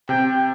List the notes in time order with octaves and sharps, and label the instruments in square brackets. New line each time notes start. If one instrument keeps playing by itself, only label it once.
[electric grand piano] C3 [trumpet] G5